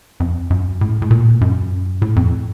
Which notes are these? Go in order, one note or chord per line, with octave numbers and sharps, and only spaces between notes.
F2
F#2
A2
A2
A#2
F#2
A2
F2